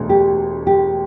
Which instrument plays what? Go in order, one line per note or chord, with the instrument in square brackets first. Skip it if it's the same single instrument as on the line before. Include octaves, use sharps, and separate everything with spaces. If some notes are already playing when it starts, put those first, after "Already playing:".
Already playing: [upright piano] E1 D2
[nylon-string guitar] G4
G4